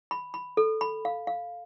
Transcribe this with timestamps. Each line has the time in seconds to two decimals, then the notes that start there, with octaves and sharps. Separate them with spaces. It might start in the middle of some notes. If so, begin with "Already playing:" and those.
0.11 B5
0.34 B5
0.57 A4
0.81 B5
1.05 F5
1.27 F5